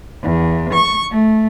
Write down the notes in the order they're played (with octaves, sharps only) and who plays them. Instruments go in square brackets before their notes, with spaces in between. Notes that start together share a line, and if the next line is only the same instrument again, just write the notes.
[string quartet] E2
C#6
A3